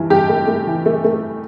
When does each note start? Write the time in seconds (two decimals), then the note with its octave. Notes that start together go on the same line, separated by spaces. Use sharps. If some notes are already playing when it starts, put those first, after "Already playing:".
Already playing: G2 E3
0.10 G2 G4
0.29 A3
0.47 A3
0.67 E3
0.86 A3
1.04 A3